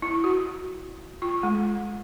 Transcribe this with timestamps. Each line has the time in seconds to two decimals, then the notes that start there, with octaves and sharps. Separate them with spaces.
0.02 E4
0.24 F#4
1.22 F4
1.43 G#3